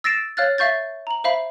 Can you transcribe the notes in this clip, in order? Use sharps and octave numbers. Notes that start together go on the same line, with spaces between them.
E6 A6 A#6 C7 D7 E7
C#5 F5 F6 F#6 A6
E5 F5 C#6 G6 A6
A#5 F#7
C5 E5 F5 B5